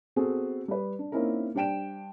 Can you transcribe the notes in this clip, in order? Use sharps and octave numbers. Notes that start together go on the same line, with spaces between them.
B3 C4 F#4 G#4 A4
G3 B4
D4
A#3 C4 C#4 D#4 E4 A#4
G3 D4 C5 G5 D7 E7